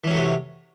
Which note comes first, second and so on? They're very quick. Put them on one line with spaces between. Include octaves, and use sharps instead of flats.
E3 C#4 F#3 A3 C3